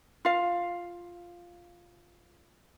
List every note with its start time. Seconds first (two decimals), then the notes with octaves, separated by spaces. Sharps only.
0.25 F4 F5